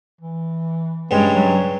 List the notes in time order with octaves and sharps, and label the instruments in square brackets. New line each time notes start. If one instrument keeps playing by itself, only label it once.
[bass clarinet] E3
[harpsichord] G2 C#3 G3 [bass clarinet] G#3
[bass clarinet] F#3